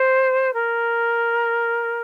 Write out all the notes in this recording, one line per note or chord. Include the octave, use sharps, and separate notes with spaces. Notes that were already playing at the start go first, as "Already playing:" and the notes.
Already playing: C5
A#4